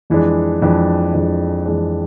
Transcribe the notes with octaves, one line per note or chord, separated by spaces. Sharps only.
F2 E3 G#3 D4
F2 E3 G#3 D4
F2 E3 G#3 D4
F2 E3 G#3 D4